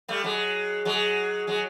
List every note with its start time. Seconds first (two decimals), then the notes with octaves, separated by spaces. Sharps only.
0.08 G3 A3
0.24 F#3 G#3
0.85 F#3 G#3
1.47 F#3 G#3